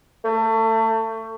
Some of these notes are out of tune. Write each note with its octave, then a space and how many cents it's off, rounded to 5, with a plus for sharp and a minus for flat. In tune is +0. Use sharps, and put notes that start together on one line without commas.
A3 +30